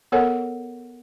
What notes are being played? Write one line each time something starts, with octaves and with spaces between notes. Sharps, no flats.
B3 A4 A#4 C#5 F#5 G#5